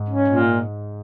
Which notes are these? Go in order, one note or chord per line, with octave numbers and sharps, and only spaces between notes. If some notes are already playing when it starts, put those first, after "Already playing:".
Already playing: G#2
C#4
A#2